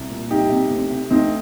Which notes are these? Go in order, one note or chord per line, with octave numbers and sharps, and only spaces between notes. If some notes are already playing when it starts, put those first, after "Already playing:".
Already playing: C2
A#2
C2 D#4 G4
C3
D2
C3
D2 C4 D#4